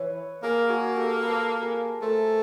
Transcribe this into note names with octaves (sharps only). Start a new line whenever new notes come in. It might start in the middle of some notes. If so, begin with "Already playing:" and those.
Already playing: E3 B4 C#5
A#3 G#4 A#4
F#4 G#4
G4 A4
A4 B4
G#4 A#4
A3 A#4 C5